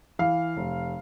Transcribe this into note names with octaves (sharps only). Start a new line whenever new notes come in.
E3 F5
F1